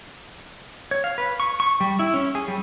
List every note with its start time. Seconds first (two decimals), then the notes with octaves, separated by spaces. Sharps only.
0.91 C#5
1.04 F5
1.18 B4
1.40 C#6
1.60 C#6
1.80 G3
1.99 E4
2.14 C#4
2.35 G#4
2.48 G3